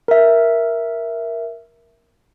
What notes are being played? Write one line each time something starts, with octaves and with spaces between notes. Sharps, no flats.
A#4 E5